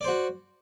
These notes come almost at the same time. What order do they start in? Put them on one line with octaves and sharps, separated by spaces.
D5 C5 F#4